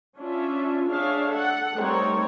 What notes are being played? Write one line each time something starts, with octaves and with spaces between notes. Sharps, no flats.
C#4 D4 F4 E5
D4 G#4 C#5 E5 F5
A4 F#5
G3 A3 C4 D#4 A#4 C#5